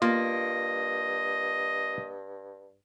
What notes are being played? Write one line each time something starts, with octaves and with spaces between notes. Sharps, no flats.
G2 A#3 F4 D#5